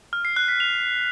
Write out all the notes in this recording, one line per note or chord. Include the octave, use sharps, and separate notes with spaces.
F6
C7
F#6
B6
F7